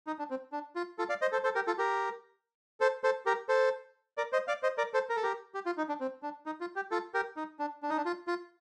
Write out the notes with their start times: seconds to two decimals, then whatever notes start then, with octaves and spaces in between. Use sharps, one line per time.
0.07 D#4
0.19 D4
0.30 C4
0.52 D4
0.76 F4
0.99 F4 A4
1.09 D5 F5
1.21 C5 D#5
1.32 A4 C5
1.44 A4 C5
1.55 G4 A#4
1.67 F4 A4
1.78 G4 A#4
2.80 A4 C5
3.04 A4 C5
3.26 G4 A#4
3.49 A4 C5
4.17 A#4 D5
4.32 C5 D#5
4.48 D5 F5
4.63 C5 D#5
4.78 A#4 D5
4.94 A4 C5
5.09 A#4
5.16 A4
5.23 G4 A#4
5.55 G4
5.66 F4
5.78 D#4
5.89 D4
6.00 C4
6.23 D4
6.46 D#4
6.61 F4
6.76 G4
6.91 F4 A4
7.14 G4 A#4
7.37 D#4
7.59 D4
7.83 D4
7.90 D#4
7.97 D4
8.05 F4
8.28 F4